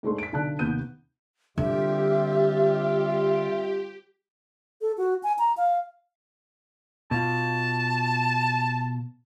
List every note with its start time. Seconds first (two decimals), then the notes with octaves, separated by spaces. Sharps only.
0.03 G#2 G#3 A3 D4 C6
0.18 B6 D7
0.32 B1 D3 A5 F#6
0.59 D#2 C3 B3 G6 D#7
1.58 D3 G3 C4 F4 G4 E5
4.81 A4
4.98 F#4
5.23 G#5
5.39 A#5
5.57 F5
7.11 B2 F4 A5